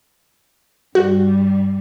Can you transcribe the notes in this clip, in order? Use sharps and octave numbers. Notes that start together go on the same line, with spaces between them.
G2 G3 F#4